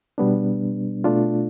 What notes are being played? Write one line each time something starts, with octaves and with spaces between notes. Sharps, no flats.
B2 G3 B3 D4
B2 A3 D4 F4